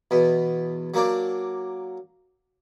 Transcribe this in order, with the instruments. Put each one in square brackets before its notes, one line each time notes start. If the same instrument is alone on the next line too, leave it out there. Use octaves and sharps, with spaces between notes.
[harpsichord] E2 B2
F#3 A#3 D4